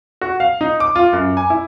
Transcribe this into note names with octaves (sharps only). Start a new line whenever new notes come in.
F#4
F5
D#4
D6
F4
F#2
G#5
E4